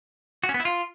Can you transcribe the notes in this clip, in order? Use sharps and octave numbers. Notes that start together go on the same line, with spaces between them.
F#4
C#4
B3
E4
F4